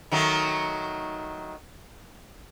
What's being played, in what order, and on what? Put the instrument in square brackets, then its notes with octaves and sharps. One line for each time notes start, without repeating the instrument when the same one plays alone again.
[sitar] D#3 F#3 A3